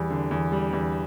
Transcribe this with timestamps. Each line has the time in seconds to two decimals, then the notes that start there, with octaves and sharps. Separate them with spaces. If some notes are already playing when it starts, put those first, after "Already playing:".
Already playing: E2 G3
0.10 D3
0.31 E2
0.52 G3
0.73 E2